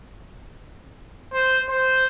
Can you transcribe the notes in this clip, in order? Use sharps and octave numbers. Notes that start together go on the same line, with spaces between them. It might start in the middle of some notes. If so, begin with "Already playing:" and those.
C5
C5